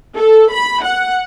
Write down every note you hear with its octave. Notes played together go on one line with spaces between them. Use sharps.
A4
B5
F#5